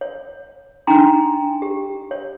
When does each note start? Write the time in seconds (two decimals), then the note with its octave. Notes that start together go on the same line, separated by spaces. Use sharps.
0.01 C#5
0.87 D4 D#4 G5 G#5 A#5 C6
1.62 G4
2.11 C#5